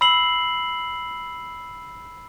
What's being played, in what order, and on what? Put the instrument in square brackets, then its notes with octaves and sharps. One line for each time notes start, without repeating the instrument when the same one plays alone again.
[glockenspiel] B5 E6 C7 F#7